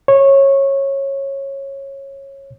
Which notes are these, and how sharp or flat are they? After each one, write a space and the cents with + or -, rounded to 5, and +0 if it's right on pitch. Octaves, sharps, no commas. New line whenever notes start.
C#5 -20